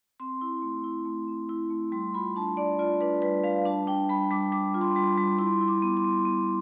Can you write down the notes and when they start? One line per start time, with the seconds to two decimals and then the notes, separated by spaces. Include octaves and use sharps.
0.20 C4 C6
0.41 E4
0.62 A3
0.84 E4
1.05 A3
1.28 C4
1.49 E4
1.70 A3
1.92 G3 C6
2.14 F4 B5
2.36 D4 A5
2.57 D4 D5
2.79 F4 D5
3.01 D4 B4
3.22 G3 B4
3.44 G3 F5
3.65 D4 A5
3.87 D4 G5
4.09 G3 B5
4.31 G3 D6
4.52 G3 D6
4.74 F4
4.81 C6
4.96 G3
5.17 G3
5.39 E4 C6
5.61 E4
5.68 D6
5.82 B3
5.97 C6
6.05 B3
6.25 B3